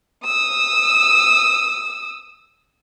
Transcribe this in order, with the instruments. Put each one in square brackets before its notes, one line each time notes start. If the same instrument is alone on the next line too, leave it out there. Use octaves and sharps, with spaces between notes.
[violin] D#6 E6